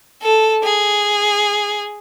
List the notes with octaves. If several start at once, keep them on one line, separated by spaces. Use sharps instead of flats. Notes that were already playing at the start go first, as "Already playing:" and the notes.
A4
G#4